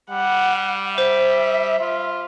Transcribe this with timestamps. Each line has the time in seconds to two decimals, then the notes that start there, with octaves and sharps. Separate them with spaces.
0.11 G3 F#5
0.98 C5 E5
1.80 F4